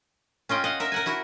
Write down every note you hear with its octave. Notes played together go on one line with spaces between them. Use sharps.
C#4 F4 D#5 G5
D#5 F5 F#5
A#4 E5
A#4 F#5 G#5
E4 F#4 A#4